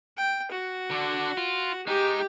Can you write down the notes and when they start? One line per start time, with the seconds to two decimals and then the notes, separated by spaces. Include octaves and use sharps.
0.18 G5
0.52 F#4
0.91 D3 D4
1.37 F4
1.87 G#3 D#4 G4 G5